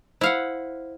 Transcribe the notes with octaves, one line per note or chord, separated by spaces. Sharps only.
E4 C5 F5 F#5